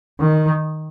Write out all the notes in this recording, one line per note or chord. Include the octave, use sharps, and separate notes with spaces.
D#3